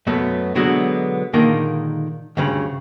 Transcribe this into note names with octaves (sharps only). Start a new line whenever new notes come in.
F#2 B2 F#3 A3 B3
B2 D3 F#3 G#3 B3 F#4
A#2 D3 D#3 G#3 A#3
D2 G2 C#3